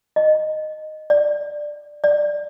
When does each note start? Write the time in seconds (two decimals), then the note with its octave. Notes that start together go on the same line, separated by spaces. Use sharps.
0.16 D#5
1.10 D5
2.04 D5